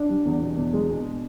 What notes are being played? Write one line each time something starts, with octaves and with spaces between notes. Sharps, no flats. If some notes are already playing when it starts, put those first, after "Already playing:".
Already playing: D4
G3
E2
B2
E2
G#3
B2